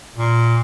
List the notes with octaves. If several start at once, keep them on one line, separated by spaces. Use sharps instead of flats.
A#2